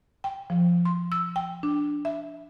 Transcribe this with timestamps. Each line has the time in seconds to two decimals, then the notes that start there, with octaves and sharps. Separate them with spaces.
0.24 G5
0.50 F3
0.85 C6
1.12 E6
1.36 G5
1.63 D4
2.05 E5